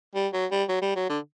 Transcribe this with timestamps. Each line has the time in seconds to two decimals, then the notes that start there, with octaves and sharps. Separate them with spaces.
0.15 G3
0.33 F#3
0.51 G3
0.69 F#3
0.82 G3
0.96 F#3
1.09 D3